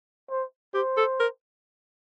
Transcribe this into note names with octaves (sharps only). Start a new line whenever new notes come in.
C5
G4 C5
A4
A#4